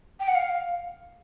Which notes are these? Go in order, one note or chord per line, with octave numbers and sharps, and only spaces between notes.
G5
F#5
F5